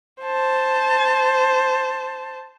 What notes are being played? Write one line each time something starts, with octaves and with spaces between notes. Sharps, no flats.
C5 A5